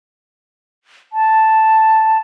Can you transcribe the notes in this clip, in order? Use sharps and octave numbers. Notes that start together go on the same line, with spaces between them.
A5